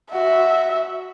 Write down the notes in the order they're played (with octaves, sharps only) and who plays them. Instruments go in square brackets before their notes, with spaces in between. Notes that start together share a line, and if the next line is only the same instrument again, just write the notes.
[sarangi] F#4 [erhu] E5